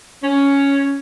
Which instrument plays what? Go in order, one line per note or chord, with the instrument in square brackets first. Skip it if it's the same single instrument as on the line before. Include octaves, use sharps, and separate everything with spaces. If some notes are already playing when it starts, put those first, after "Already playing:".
[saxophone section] C#4